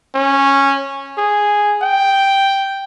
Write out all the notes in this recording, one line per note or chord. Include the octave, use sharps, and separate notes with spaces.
C#4
G#4
G5